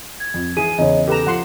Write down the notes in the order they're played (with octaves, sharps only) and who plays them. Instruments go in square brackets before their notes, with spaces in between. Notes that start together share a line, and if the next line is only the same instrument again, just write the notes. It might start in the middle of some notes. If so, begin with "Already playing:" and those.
[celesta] G#6
[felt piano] F2
[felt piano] E3 [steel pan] G#4 [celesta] D#7
[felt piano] E2 C#3 [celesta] C#5 D#5
[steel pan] G4 B4 A#5 [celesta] A4 E7
[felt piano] F3 [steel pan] F#5 C6